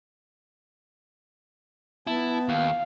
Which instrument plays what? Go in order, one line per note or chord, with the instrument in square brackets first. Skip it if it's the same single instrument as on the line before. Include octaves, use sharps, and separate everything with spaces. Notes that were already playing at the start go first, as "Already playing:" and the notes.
[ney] B3 [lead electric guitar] E4 [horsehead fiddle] A5
[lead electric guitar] D#2 [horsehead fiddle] F5